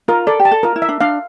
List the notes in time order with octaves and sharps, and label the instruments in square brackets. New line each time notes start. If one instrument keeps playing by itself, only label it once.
[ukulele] F4 [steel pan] A#4
[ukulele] A4 [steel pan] D5
[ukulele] G4
[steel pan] A5
[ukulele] A4
[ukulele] F4 [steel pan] A#4
[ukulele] E4
[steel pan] E5
[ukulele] D4
[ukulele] D4 [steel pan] F5